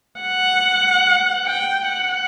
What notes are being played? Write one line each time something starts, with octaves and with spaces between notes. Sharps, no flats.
F#5
G5
F#5